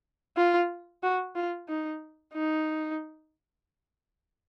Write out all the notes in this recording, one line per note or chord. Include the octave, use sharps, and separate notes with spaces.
F4
F#4
F4
D#4
D#4